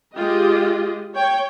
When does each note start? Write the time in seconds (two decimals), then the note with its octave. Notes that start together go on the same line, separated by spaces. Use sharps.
0.14 G#3 F4 G4 D#5
1.15 C#5 G5